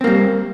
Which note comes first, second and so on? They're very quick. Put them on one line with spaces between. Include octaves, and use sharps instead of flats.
C4 A#3 G3